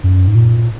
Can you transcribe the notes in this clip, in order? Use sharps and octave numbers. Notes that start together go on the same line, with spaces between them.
F#2
G#2
A#2